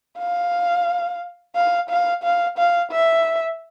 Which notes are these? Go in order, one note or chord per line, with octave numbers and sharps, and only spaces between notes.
F5
F5
F5
F5
F5
E5